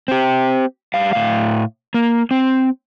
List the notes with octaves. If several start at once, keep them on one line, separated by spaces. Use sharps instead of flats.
C4 G4
G3 F5
A2 F5
A#3
C4